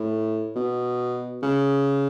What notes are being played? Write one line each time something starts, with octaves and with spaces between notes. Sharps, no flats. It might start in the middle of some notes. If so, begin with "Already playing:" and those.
Already playing: A2
B2
C#3